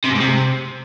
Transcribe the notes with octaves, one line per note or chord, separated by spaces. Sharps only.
C3
F#2
G#2
C3